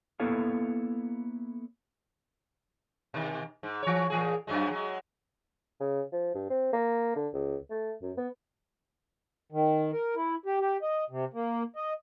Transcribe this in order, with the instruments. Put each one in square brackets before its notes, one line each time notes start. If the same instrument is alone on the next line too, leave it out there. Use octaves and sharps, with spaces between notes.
[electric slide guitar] A#3 B3 E4 A4 C#5 F5
[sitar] B2 D#3
G#2
E3 C#5
A#2 E3 G#4
F#2 F#3 G#3
F#3 G#3
[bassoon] C#3
F3
G2
C4
A#3
D3
C#2
A3
F#2
B3
[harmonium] D#3
A#4
E4
G4
G4
D#5
C3
A#3
D#5